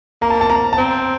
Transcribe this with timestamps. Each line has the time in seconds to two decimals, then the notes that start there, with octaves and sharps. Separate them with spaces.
0.22 A#3 A#5
0.30 A5
0.41 A5
0.50 A#5
0.73 A5
0.78 C4 A#5